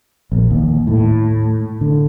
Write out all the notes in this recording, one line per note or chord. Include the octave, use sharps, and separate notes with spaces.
A#1
D#2
A2
D3